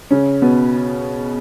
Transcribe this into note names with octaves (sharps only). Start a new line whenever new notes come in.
C#3 C#4
B2 B3